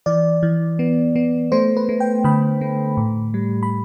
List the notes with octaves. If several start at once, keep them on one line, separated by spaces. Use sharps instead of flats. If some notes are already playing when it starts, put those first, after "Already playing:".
E3 D5
E3
B3
B3
A3 C5
B4
A3
G5
D3 B5
A3
A2
G3
B5